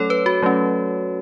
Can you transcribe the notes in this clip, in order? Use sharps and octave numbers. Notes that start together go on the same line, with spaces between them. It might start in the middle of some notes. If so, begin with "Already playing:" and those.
Already playing: F#3 A3 C#4 A4 C#5
B4
F#4
F#3 A3 C#4